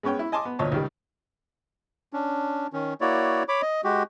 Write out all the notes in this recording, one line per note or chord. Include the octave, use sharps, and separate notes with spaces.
G#3 B3 C#4 C#5 G5
E4
D#5 G#5 A5 C6 D6
B3
D2 A#2 C#5 D#5 A5
C#2 D#3 G3
C#4 D4
D#3 C#4
A#3 E4 F#4 C#5 D5
C#5 B5 D6
D#5
G#3 F#4 G4